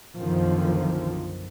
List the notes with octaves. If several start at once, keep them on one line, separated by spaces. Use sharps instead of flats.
B1 F#2 D3 D#3 F3